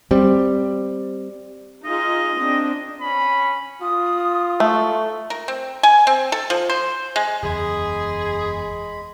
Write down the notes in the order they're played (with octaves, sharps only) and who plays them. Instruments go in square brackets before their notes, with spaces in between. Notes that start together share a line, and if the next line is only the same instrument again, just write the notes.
[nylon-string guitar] G3 C4
[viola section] D#4 F4 G#4 [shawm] D#5
[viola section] C4 D4
[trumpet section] C#4 B5
[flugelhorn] F4 [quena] D#6
[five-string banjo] A3 [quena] C#6
[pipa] A#4
C4
G#5
C4
A4
F3
C5
G#3
[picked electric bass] F#1 E2 [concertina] G#3 B5 [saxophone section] G#4